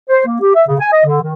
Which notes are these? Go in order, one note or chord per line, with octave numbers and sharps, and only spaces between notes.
C5
A#3
G4
E5
C#3
G#5
D#5
D3
D#3